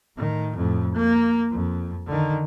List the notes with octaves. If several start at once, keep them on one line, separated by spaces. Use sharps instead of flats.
A2 D#3
F2 A2
A#3
F2
D3 D#3